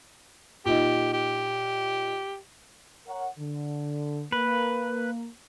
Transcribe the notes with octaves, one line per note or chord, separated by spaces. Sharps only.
A#2 D#4 G4
G4
A#4 C#5 F#5
D3
A#3 B4